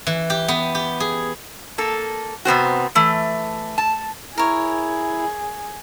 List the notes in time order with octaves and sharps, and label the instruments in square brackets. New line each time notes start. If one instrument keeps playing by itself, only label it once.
[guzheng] E3
G4
B3
G4
G#4
[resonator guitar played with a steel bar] A#3 A4
C3 B3 C4 F#4
E3 A3
A5
[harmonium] E4 [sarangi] G#4 [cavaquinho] A#4 C#5